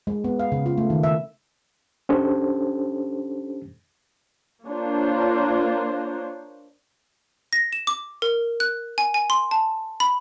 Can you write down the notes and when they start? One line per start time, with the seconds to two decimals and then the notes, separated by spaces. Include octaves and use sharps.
0.07 G#3
0.24 B3
0.39 F5
0.52 C#3
0.66 F4
0.78 A3
0.90 D#3
1.03 E5
2.09 C#4 D4 G4 A4 C5
4.67 A#3 D4 F4 A#4 C5 C#5
7.53 A#6
7.73 E7
7.87 D6
8.22 A#4
8.60 F#6
8.98 G#5
9.14 G#5
9.30 C6
9.51 A5
10.00 B5